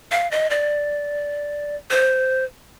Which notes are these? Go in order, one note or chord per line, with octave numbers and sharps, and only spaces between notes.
F5
D#5
D5
C5